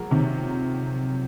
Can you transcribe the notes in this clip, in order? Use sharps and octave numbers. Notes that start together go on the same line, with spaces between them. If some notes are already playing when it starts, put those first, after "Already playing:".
Already playing: F3 F#3 G#3 A#3
C3 D#3